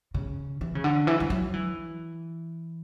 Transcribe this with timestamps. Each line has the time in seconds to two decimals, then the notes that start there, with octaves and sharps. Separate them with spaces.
0.14 C#3
0.61 E3
0.75 C#3
0.84 D3
1.07 E3
1.20 G3
1.30 F#3
1.54 E3